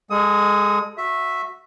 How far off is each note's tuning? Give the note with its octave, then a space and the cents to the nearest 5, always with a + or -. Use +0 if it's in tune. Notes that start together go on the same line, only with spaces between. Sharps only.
G#3 -15 A4 +0 D#6 +25
F#4 -20 E5 +0